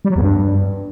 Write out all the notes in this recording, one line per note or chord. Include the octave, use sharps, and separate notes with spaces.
G3
F#3
E2
G2